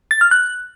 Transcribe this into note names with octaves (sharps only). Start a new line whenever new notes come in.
A6
F6
F#6